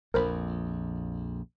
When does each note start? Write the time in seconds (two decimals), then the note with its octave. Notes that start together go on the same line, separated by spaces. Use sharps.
0.14 A#1 F2 A#4 C5 B5